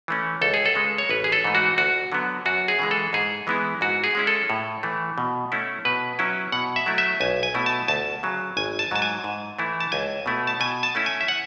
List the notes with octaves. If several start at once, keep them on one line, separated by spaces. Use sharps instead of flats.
E3 A3 C#4
C#2 A4
G#4
A4
C#3 G#3
C#5
A1 B4
G#4
A4
G#2 E3 A3
F#4
D2 F#4
D3 F#3 B3
F#2 F#4
G#4
C#3 E3 G#3
A4
G#2 G#4
E3 G#3 B3 E4
G#2 F#4
G#4
G#3 C#4 E4
A4
A2
E3 A3
B2
A3 C#4 E4
B2 B4
F#3 C#4 E4
B2 F#5
E5
F#3 A3 E4
E5
B1 G#5
G#5
B2 A3 E4
A5
D2 A5
C#3 F#3
G#1 G#5
A5
G#2 F#3 A5
G#5
G#2
E3 A3 E4
A5
C#2 G#5
B2 A3 E4
A5
B2 G#5
A5
A3 C#4 E4
G#5
E5
F#5